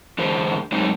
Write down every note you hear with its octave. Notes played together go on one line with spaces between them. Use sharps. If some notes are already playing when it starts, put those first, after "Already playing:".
D3 E3 G#3 C5
F#3 G#3 C4 D#4